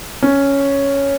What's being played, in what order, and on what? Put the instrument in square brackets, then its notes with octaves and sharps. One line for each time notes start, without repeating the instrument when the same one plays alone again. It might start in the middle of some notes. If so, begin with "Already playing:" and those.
[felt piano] C#4